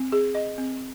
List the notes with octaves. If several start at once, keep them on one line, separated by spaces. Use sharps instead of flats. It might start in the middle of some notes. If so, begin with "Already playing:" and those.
Already playing: C4
G#4
D#5
C4